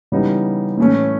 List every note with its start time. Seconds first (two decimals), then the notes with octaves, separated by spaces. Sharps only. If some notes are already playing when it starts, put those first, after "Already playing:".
0.12 C#3 E3 G3 B3 D#4
0.77 A2 E3 A3 C#4